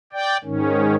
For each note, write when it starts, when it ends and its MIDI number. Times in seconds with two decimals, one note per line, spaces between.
0.13 0.37 74
0.13 0.37 79
0.44 0.96 44
0.44 0.96 51
0.44 0.96 61